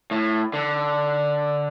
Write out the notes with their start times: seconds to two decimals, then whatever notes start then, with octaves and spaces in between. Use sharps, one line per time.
0.11 A2
0.54 D3